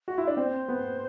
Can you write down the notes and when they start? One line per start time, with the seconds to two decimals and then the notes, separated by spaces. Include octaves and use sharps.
0.08 F#4
0.18 E4
0.27 D4
0.37 C4 C5
0.68 B3